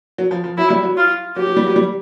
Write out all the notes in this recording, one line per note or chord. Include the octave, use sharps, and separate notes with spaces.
F#3
F3
F3
F#3 E4
G3
F#3
F4
F#3 G4
F#3
G3
F#3
G3